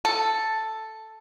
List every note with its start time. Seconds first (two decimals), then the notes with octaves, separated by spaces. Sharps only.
0.05 A4